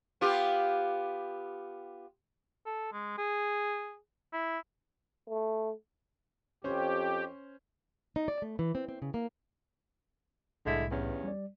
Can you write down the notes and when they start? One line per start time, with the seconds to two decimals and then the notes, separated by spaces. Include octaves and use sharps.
0.21 B3 F4 G4
2.66 A4
2.93 G#3
3.18 G#4
4.33 E4
5.29 A3
6.64 F2 C#4 G4 C5
8.16 D#4
8.28 D5
8.42 A3
8.59 E3
8.75 C4
8.89 C4
9.02 C#3
9.14 A#3
10.66 C2 A2 D3 G#3 E4
10.90 E2 G2 C#4
11.24 G3 D5